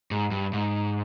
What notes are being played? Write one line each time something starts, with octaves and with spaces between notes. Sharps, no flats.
G#2
G2
G#2